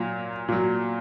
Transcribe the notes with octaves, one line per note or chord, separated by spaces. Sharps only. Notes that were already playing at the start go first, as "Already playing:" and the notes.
Already playing: A#2 F#3
A#2 F#3